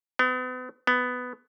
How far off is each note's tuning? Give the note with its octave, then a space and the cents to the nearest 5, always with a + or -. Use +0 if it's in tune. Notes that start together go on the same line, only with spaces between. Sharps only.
B3 +40
B3 +10